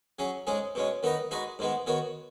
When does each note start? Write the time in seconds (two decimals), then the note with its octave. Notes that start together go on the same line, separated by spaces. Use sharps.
0.19 F#3 C#4 G#4
0.47 G#2 G#3 C#4 G#4
0.75 B2 G#3 C#4
1.03 D#3 B3 D#4 B4 D#5
1.31 G#3 D#4 F#4 B4 D#5
1.59 G#2 D#3 G#3 B3
1.87 D#3 B3 F#4 C#5